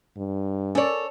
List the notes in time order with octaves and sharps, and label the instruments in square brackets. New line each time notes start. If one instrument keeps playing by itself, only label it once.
[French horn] G2
[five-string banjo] C#4 A#4 D5 [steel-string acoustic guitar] A4 C#5